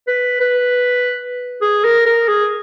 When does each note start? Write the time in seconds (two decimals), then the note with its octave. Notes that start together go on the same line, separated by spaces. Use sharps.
0.07 B4
0.41 B4
1.62 G#4
1.84 A#4
2.06 A#4
2.28 G#4